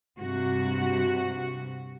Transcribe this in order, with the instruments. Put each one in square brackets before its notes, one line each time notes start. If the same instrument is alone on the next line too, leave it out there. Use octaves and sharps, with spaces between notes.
[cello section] G2 C3 F#4